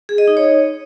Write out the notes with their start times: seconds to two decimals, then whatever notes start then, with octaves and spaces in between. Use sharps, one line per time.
0.09 G#4
0.18 D#5
0.28 D#4
0.37 C#5